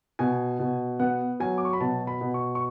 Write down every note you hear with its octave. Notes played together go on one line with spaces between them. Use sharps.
B2 G#5
B2
B3 F#5
F#3 G#5
D6
C#6
B5
B2 A5
B5
B2
C#6
C#6